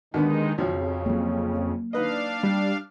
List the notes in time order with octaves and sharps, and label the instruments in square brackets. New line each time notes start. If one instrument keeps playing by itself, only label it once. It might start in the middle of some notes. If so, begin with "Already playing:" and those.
[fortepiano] D#2 D3 B3 [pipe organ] D#3 G#3 D#4
[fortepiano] B1 F3 C#4 [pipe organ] F2 C#3
[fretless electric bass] F#3 A#3
[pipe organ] D4 F5 [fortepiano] D#4 B4 D#5
[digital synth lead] G3